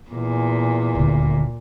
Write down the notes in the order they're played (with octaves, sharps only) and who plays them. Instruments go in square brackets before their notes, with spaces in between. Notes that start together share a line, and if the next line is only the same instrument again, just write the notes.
[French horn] E2 [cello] A#2
[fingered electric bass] D#1 D2